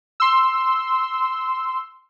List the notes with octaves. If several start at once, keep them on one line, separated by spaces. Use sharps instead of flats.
C6 E6